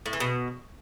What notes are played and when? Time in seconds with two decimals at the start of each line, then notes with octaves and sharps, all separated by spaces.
0.06 A2
0.13 E3
0.20 B2